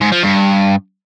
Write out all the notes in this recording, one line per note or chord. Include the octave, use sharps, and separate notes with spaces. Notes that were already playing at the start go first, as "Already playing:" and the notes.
G#2
F3
G2